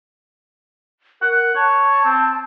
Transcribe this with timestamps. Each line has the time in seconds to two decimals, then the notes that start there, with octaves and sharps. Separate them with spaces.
1.22 A#4 F#5
1.56 C#5 A5
2.05 C4